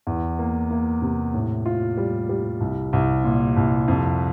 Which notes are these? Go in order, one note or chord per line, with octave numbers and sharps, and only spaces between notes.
E2
A#3
A#3
C3
A2
F4
G3
G3
C2
C2
A#2
C2
F2